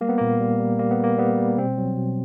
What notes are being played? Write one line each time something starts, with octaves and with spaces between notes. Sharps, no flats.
G3 A#3
B3
A#2 A#3
G3
G3
G3 A#3
B3
G3 A#3
G3 B3
G3
B2 C4
F#3
B2